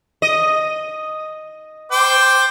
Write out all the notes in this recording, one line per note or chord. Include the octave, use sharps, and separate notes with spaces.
D#5
C5 G5 D6